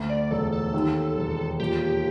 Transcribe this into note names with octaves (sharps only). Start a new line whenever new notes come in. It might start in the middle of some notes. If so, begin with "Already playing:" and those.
Already playing: D2
D5
E1 A4
A4
D#2
E1
A#2 G4